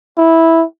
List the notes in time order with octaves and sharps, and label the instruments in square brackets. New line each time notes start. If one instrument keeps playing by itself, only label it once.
[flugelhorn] E4